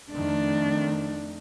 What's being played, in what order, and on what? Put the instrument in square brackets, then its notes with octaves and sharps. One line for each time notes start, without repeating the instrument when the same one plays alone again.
[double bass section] F2 D#3 A3 [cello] D4